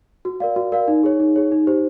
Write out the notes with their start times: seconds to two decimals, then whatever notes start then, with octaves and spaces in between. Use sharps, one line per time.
0.25 F#4
0.40 A#4 D5 F5
0.56 F#4
0.72 A#4 D5 F5
0.88 D#4
1.03 G#4 C#5
1.20 D#4
1.36 G#4 C#5
1.52 D#4
1.67 G4 C5